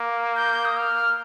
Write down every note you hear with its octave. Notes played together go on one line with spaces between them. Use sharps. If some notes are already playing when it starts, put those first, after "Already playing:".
Already playing: A#3
G6
D#6
F6